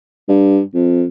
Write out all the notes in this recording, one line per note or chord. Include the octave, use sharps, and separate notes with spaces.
G2
F2